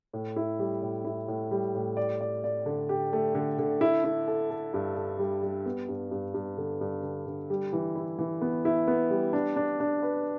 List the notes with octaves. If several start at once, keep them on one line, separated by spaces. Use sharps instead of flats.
A2
E4
G3
A2
E4
A2
G3
A2
D5
D5
D5
D3
G4
A3
D3
D3
E4
E4
A4
A4
G2
A4
G3
G3
B3
G2
G2
G2
D3
G2
D3
D3
G3
E3
E4
E3
B3
E4
B3
G3
D4
D4
D4
B4